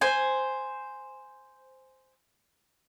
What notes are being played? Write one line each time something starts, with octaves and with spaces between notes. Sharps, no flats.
C5 G#5